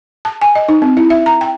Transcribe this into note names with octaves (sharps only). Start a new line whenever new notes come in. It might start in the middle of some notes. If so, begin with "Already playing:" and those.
A5
G#5
D#5
D#4
C4
E4
E5
A#5
G5